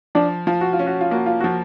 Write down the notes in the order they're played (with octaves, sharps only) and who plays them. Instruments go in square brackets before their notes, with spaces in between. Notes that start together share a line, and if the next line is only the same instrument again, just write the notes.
[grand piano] F3 [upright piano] D4
[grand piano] F3 [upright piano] F4
[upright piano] F#4
F4
[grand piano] C#4
[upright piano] F#4
F4
[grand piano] A#3 [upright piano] F#4
[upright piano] F4
[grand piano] F3 [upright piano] F#4